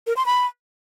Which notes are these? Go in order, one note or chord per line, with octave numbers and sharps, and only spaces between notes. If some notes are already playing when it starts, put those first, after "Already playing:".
A#4
C6
B5